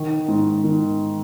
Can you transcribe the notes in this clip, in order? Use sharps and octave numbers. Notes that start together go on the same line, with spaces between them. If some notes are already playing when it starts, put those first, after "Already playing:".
Already playing: D#3
G#2
D#3